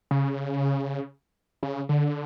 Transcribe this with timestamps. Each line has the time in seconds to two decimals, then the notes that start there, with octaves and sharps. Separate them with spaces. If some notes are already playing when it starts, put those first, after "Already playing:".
0.11 C#3
1.63 C#3
1.89 D3